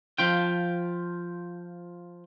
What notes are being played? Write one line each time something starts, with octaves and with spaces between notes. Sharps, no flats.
F3 F4 G5